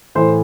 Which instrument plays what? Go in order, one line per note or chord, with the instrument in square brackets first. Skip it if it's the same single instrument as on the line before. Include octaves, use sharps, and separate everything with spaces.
[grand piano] A2 E3 C5